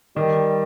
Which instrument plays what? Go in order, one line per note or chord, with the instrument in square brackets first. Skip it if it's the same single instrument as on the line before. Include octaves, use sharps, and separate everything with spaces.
[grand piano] D#3 [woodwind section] G3